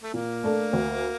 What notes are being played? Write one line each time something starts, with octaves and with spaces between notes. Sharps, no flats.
A3
A#2 A#3
A3 D4 A4
D2